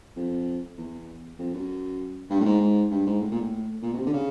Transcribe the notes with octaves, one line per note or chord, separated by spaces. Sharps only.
F2
E2
F2
F#2
G2
A2
G#2
G#2
G2
G#2
A2
A#2
A2
A#2
B2
C3
D3
C#3